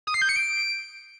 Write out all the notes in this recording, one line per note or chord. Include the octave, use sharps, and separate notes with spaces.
D#6
C7
G6
C#7
D7